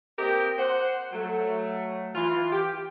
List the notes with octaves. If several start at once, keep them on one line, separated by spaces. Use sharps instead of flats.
A#3 C4 G4 A#4 D#5 G5
C5 F#5
F#3 A3
E3 F4 C6
G4